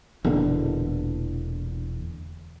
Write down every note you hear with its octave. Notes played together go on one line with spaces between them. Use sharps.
E1 E2 A#2 D3